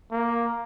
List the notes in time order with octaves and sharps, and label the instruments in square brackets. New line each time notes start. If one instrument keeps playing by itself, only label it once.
[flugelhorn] A#3